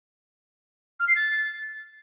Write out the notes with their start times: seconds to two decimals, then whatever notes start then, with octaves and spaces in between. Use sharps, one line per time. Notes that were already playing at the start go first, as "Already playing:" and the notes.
0.99 F6
1.07 C7
1.15 A6